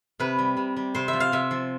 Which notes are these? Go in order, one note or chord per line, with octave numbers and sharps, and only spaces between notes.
C3 B4
G3
C3
G3
C3 C5
E5
F3
F5
C3 E5
F3